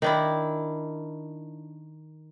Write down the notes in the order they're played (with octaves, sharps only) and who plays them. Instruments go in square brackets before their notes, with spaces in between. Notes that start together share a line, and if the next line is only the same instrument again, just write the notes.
[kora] D#3 D4 E4